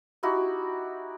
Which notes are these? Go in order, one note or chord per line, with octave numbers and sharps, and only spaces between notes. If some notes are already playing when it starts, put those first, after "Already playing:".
D#4 E4 F#4 G4